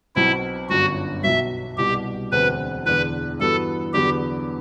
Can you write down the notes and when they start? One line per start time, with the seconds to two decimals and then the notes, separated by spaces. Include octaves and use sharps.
0.16 B1 B2 F#3 C4 E4 F#4
0.70 G1 F#2 D3 F#3 F#4
1.23 B1 B2 F#3 E5
1.78 C2 B2 G3 G4
2.32 E1 D2 D3 F#3 C4 B4
2.86 E1 E2 D3 B4
3.40 G2 E3 B3 F#4 A4
3.93 E2 D3 F#3 B3 G4